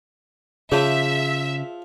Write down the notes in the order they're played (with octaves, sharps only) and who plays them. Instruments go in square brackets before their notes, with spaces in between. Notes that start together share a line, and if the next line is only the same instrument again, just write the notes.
[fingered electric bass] C#3 [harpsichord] F3 [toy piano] G#4 C#5 A5 [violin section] E5